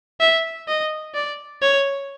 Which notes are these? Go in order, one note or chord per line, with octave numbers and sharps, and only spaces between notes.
E5
D#5
D5
C#5